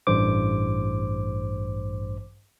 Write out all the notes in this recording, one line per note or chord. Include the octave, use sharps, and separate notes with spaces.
A1 G2 C5 D6